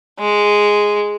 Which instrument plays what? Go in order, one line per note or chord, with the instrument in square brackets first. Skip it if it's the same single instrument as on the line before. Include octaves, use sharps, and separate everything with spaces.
[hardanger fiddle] G#3